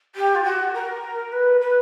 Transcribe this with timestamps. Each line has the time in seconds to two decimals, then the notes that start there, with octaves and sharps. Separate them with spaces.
0.15 G4
0.35 F4
0.43 F#4
0.73 A#4
1.32 B4
1.60 B4